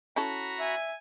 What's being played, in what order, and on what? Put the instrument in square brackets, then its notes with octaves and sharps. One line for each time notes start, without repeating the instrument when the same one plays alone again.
[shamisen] C#4 E4 A4 [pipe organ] F#4 A#5 B5
[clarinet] E5 [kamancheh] G#5